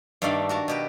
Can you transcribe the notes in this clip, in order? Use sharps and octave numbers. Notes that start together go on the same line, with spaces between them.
G2 D#3 A3 A#3 D5 F5
F#4 A#4 A5
B2 G4 B4